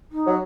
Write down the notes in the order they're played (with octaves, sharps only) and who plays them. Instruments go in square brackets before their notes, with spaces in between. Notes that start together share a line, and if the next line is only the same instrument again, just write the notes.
[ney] D#4
[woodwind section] F#3